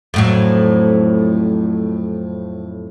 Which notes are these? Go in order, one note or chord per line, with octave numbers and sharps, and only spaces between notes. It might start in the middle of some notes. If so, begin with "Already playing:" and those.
F2 A2 F#3